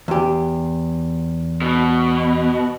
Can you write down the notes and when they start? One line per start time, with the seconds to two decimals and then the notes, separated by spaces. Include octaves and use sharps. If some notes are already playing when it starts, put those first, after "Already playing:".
0.08 E2 G4
1.61 B2